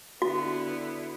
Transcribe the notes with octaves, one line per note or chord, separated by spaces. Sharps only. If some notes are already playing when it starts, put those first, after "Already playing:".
D3 B3 E4 F#4